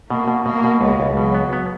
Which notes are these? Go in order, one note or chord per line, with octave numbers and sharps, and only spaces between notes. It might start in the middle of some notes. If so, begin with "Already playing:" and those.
B2 A#3
B2
B2 A#3
B2
C#2 G#3
C#2
B2 F#3
B3
B3